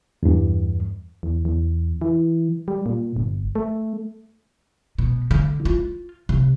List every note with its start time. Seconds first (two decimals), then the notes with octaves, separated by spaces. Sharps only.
0.23 E2 G2
1.23 E2
1.45 E2
2.01 E3
2.68 G3
2.86 A#2
3.16 G1
3.55 A3
4.98 B2
5.31 D3
5.65 F4
6.29 C3